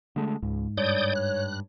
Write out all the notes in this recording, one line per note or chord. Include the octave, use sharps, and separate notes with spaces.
D3 G#3 A3
C#2 G#2
G2 C#5 D5 D#6 G6
F#6